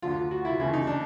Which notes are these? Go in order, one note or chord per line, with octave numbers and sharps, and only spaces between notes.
D2 D3 F3 F4
F#4
E4
F4
D#2 C#3 E3 E4
D#4
D4